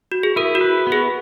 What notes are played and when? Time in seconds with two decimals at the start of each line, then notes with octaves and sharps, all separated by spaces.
0.12 F#4
0.23 G#4
0.36 E4 A#4
0.55 F#4
0.61 B4
0.87 B3
0.92 G#4